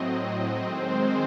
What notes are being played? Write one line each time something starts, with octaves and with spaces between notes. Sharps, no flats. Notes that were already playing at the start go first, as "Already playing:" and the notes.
Already playing: A2 F#3 C4 D#5
D#3 G#3 C4 C5